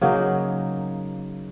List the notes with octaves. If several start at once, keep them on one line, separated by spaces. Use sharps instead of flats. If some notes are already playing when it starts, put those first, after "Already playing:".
C#3 F#3 A#3 D#4